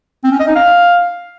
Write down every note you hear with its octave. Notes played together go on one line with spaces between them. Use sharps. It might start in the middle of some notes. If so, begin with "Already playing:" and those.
C4
C#4
D#5
D#4
F5